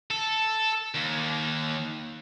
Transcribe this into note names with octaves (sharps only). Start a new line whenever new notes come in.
A4
D#2